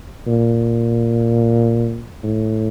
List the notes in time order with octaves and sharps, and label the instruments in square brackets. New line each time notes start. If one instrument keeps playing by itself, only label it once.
[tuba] A#2
A2